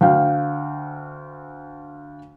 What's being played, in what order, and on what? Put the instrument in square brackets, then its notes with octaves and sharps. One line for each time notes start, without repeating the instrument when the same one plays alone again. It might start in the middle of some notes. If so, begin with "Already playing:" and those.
[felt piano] D2 F5 G5